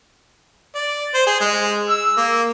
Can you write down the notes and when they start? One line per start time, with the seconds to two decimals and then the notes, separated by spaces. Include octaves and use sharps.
0.75 D5
1.14 C5
1.27 G#4
1.40 G#3
1.89 E6
2.17 A#3